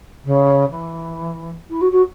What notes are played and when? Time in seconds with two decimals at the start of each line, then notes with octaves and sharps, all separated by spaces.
0.25 C#3
0.70 E3
1.70 E4
1.81 F#4
1.92 F#4